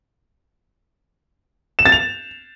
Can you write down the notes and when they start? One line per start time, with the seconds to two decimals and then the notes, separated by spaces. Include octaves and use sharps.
1.79 E7
1.85 A6
1.92 F7